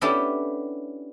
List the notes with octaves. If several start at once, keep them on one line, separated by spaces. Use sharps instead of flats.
B3 C#4 D4 E4 G4 A4